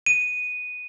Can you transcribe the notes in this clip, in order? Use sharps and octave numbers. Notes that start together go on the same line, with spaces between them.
D#7